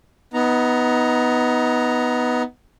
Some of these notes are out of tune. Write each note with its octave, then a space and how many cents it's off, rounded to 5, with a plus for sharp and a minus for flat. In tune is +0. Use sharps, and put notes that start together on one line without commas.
B3 +0 D#4 +25 A#5 +0